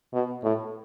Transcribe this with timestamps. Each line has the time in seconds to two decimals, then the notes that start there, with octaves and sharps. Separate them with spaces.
0.14 B2
0.43 A2